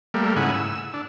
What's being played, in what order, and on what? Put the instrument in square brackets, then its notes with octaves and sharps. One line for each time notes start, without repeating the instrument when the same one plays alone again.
[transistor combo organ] G3 A3 A#3
G#2 C#3 E4 F#5 G#5
E6
D4